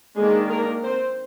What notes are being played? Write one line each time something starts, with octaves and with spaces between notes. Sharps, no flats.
D#3 G#3 A#3 D4 G#4
A#3 A#4
C4 C5